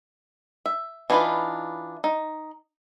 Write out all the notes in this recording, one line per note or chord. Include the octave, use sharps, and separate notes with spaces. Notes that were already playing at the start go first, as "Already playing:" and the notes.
E5
E3 D4 D#4 F4 B4
D#4